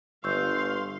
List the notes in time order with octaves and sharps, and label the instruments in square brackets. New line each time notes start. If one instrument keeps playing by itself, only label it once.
[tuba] G1 [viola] F5 C6 [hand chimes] C#6 E6 G6